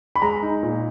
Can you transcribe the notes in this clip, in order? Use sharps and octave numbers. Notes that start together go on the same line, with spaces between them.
B5
G#3 A#5
D#4
A#2